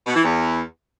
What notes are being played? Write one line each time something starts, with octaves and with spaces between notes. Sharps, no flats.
B2
E3
E2